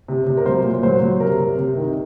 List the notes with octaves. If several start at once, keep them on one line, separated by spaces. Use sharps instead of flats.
C3
C3
A#4
F#3 C5
A#2
F#3 C5
F#3
C3 A#4
C3
C3
D#3